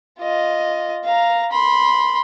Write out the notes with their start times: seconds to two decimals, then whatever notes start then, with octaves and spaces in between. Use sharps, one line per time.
0.19 F4 D#5
1.05 F5 A#5
1.51 B5 C6